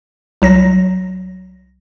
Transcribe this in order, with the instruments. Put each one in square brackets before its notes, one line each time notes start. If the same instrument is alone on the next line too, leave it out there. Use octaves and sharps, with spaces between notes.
[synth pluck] C2 F#3 A#6